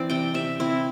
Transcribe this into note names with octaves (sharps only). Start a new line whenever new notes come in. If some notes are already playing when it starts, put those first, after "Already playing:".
Already playing: E3 C4 C5 D5
C3 G5
C3 E5
C4 E4